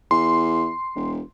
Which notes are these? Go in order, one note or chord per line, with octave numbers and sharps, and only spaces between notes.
E2 C6
E1